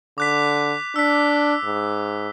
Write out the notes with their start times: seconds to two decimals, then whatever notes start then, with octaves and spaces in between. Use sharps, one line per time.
0.18 D3 D6 F#6 B6
0.96 D4 E6 B6
1.64 G#2